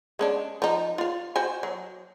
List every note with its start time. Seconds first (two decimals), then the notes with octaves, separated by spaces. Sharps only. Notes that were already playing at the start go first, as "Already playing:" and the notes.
0.19 G#3 C#4 D4
0.62 F3 D#4
0.98 F4 F5
1.36 F#4 C5 G#5
1.63 F#3